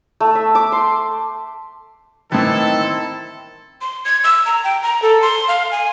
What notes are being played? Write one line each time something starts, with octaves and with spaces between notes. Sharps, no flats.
A3
E5
D6
C6
A2 D#3 E3 C4 E4 A4 A5
C6
G#6
E6
A#5
G5
A#5
A4
C6
F5
G#5